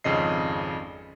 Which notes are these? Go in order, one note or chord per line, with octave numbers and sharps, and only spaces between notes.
G#1 F2 C#3 D#5 C7